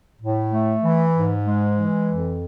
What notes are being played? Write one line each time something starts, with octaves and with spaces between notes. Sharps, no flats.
A2
A3
E3
G#2
G#3
E3
F2